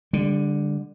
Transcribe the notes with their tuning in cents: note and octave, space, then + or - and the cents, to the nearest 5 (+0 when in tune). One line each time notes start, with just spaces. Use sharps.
D3 +0 G3 +35